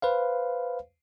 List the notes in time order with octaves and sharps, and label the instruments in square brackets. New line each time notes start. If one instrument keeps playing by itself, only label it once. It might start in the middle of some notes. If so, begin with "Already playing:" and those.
[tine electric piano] B4 C5 F5